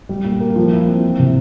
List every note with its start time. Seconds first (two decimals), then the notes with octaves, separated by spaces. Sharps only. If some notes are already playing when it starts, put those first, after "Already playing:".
0.09 G3
0.25 A#2
0.40 A#3
0.56 F3
0.72 E4
0.87 C4
1.04 E3
1.19 C3